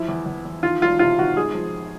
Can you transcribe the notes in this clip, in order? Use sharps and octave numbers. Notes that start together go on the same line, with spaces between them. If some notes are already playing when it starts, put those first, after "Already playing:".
Already playing: F3 E4
E2
E2
E2
D#3 F4
E1 F4
C3 F4
D#3 F#4
G#1 G#4
F3